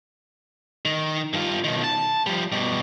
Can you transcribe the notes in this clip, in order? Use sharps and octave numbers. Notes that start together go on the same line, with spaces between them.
D#3
G2 F4
B2 D#3
A5
F3 G3
G2 B2